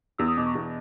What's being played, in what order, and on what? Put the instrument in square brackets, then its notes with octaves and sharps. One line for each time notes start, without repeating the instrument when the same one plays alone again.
[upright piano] E2 [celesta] E6
[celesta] D#6
[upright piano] B2 [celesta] D6
[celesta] C#6
[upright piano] E2